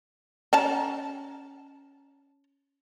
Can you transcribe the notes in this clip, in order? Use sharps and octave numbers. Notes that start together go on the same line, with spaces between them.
C#4 A5 A#5